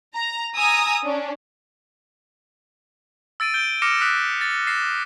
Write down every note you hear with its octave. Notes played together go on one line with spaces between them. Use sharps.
A#5
G#5 A#5 D#6 E6
C#4 D4
E6 A6 D7 D#7
G6 D7 G7
D6 F6 A#6 C#7 D7 E7
D#6 F#6 B6
A6
A6 A#6 C7 E7